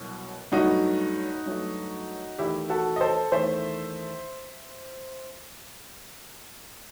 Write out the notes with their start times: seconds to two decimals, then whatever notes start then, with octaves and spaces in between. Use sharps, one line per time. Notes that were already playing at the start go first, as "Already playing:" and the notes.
Already playing: C2 B2 F#3
0.52 G2 F#3 A3 D#4 F#4
1.46 G2 F#3 A3
2.38 E2 D#3 A3 E4 G4
2.70 F#4 A4
2.96 D#5
3.01 A4 C5
3.32 E2 D#3 A3 C5 E5